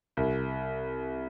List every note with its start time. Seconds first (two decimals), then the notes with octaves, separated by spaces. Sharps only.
0.17 C2